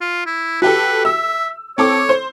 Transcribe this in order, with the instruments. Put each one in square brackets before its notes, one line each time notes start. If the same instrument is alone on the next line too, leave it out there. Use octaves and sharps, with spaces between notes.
[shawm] F4
E4
[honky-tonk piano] F#4 G4 A4 [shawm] B4
[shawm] E5 [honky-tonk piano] E6
[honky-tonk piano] C4 A4 D6 [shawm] C#5
[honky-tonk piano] C5